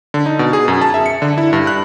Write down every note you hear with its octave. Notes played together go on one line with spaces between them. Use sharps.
D3
D#4
B2
G#4
F#2
A5
E5
C#7
D3
E4
G2
F#6